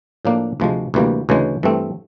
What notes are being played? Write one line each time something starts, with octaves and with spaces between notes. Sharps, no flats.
A2 F3 A#3 D4
D2 C3 F3 G#3
D2 C3 E3 G3 A#3
D2 C#3 E3 G#3
G2 E3 A3 C4